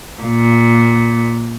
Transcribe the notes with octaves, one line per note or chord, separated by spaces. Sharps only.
A#2